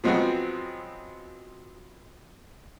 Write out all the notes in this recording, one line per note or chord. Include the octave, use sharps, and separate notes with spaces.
F3 F#3 G#3 B3 C4 F#4